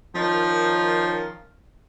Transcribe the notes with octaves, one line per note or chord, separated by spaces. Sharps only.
D#3 F3 C#4 D#4 F4 A#4